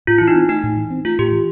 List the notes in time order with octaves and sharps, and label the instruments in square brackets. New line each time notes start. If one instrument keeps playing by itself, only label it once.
[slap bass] A2 [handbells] F4
[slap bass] E3 [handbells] E4
[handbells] D#4
[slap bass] C4
[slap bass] A3 [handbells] D#4
[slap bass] A2
E3
C4
[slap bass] A3 [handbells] F4
[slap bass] A2 [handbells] G4
[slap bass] E3